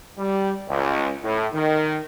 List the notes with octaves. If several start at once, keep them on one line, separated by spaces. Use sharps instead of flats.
G3
C#2
A2
D#3